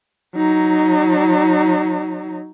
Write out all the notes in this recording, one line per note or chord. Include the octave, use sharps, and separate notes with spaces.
F#3 D#4